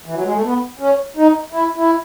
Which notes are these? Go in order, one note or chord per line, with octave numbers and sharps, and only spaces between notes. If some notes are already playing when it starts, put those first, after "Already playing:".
E3
F#3
G#3
A3
B3
C#4
D#4
E4
E4